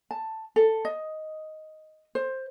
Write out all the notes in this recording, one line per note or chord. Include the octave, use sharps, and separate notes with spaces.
A5
A4
D#5
C5